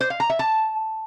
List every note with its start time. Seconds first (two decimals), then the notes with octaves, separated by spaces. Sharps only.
0.01 C5
0.10 F5
0.20 A#5
0.30 E5
0.39 A5